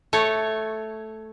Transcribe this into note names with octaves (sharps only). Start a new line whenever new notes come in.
A3 C#5